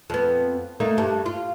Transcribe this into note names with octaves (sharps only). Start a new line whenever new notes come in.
F2 B3
A3 A#3 D#4
G2
F4